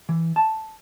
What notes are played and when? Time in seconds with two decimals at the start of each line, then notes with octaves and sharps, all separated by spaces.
0.09 E3
0.36 A5